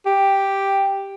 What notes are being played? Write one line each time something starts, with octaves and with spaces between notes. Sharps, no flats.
G4